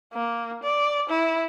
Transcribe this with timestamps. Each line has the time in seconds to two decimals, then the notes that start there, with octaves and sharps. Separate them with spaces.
0.13 A#3
0.63 D5
1.09 E4